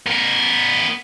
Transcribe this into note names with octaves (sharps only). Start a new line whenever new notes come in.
B3 A#4